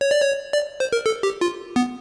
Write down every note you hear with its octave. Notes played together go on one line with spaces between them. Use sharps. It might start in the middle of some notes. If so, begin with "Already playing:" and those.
C#5
D5
C#5
D5
C5
A#4
A4
G4
F4
B3